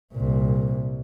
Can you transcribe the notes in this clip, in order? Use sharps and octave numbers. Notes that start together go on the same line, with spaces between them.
C2 A#2